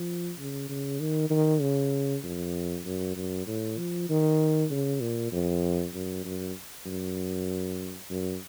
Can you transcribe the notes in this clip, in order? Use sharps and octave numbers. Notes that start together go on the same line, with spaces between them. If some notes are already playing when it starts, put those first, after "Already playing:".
Already playing: F3
C#3
C#3
D#3
D#3
C#3
F2
F#2
F#2
A2
F3
D#3
C#3
A#2
F2
F#2
F#2
F#2
F#2